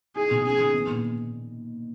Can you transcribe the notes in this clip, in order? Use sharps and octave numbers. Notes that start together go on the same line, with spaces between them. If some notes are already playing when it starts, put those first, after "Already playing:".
D#4 G#4
B2
C#4 G#4
D#3
B3
A#2